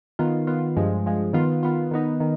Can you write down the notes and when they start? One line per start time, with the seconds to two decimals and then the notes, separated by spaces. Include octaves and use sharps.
0.19 D#3 B3 F4
0.47 D#3 B3 F4
0.77 G2 F3 G#3
1.05 G2 F3 G#3
1.33 D#3 B3 F4
1.63 D#3 B3 F4
1.91 D#3 B3 D#4
2.20 D#3